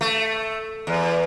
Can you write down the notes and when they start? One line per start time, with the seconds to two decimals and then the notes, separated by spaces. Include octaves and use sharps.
0.01 A3
0.87 E2